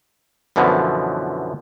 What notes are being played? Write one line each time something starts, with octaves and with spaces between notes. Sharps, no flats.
F#2 B2 D3 E3 F3 B3